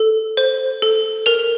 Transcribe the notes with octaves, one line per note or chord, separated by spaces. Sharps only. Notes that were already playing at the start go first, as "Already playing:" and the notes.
Already playing: A4
C5
A4
A#4 F7